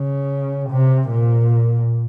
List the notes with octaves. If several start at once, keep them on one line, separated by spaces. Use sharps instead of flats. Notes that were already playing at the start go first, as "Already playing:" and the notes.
Already playing: C#3
C3
A#2